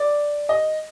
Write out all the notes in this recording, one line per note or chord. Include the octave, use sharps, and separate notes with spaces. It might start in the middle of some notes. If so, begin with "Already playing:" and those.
Already playing: D5
D#5